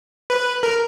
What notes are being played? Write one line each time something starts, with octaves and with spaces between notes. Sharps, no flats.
B4
A#4